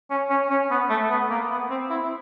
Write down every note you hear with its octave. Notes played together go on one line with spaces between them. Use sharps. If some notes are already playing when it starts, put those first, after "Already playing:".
C#4
C#4
C#4
B3
A3
B3
A#3
B3
C4
E4